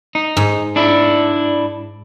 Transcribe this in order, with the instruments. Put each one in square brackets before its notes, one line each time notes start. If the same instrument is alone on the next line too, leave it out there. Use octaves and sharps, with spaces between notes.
[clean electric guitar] D#4
[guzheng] G#2
[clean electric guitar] D4 E4